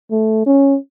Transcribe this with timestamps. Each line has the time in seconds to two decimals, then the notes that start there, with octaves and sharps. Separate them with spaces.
0.11 A3
0.46 C#4